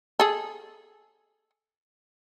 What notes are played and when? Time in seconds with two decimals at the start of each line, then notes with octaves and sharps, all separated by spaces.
0.20 G#4 A4